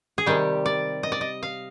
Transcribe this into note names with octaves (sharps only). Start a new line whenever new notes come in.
G#4
C3 D#3 G3 G4
D5
D#5
D5
D#5
F5